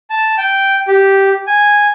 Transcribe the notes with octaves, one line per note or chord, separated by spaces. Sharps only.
A5
G5
G4
G#5